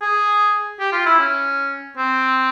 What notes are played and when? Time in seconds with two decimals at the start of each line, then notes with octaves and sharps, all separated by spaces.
0.02 G#4
0.80 G4
0.92 F4
1.06 E4
1.19 C#4
1.97 C4